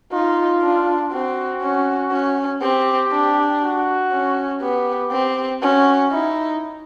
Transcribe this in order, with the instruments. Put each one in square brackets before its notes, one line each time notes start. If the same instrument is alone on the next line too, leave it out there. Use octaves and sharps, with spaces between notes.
[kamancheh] D#4 [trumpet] F4
[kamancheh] D4
[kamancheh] C4 [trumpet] F#4
[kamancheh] C#4
C#4
[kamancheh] C4 [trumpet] G4
[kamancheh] D4
[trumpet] F#4
[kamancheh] C#4
[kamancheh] B3 [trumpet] G4
[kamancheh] C4
[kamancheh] C#4 [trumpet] F#4
[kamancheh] D#4 [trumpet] E4